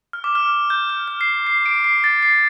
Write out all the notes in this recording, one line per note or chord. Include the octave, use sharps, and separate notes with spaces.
F6
D6
F6
G6
F6
F6
C7
C7
D7
C7
A6
C7